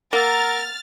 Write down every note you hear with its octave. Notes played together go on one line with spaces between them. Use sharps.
A#3 A#4 F#5 A#5 E6 F6 A6